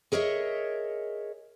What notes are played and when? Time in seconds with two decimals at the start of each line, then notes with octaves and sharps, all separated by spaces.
0.12 G#4 A#4 C#5 D#5 E5